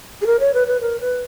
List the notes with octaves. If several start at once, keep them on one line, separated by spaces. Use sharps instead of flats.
G#4
A#4
C#5
B4
B4
A#4
B4